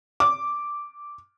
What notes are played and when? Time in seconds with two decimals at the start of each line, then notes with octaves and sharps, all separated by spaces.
0.20 D6